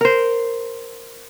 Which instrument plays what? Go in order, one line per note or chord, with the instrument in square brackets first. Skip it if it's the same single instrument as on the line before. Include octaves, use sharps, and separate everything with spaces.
[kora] A#4 C5